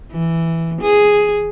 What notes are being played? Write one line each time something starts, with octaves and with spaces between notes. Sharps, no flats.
E3
G#4